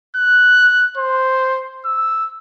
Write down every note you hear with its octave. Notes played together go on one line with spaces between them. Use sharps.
F#6
C5
E6